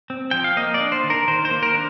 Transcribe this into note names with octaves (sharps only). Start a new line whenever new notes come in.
C4
F3 G5
F5
A#3 D#5
D5
D4
C5
D#3
A#4
D#3 C5
C5
A#3
A#4
D4